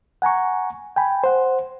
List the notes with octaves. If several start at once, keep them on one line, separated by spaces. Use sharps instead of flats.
F#5 G#5 A#5 C#6
G5 G#5 B5
C5 F#5